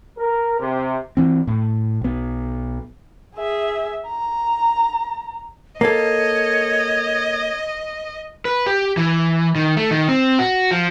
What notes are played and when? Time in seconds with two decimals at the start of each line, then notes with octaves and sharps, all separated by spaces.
0.17 A#4
0.60 C3
1.17 E3 C4
1.47 A2
2.01 B1 B3
3.36 G#4 E5
4.07 A#5
5.81 A#3 A4 C#5 D#5
8.45 B4
8.67 G4
8.97 E3
9.55 D#3
9.77 A3
9.91 D#3
10.08 C4
10.39 F#4
10.71 F3